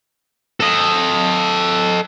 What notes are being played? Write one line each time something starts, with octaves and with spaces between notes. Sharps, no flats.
A4 D#5